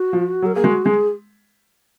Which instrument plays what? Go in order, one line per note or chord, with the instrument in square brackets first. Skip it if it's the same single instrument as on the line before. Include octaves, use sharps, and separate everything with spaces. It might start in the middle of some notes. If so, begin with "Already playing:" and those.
Already playing: [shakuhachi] F#4
[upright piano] F3
F#3
[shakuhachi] A#4
[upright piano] A#3 [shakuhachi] G#4
[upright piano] G#3 [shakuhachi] F#4
[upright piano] G#3 [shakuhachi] G#4